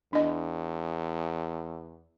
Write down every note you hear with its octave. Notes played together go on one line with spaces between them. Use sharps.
E2 D4 D#5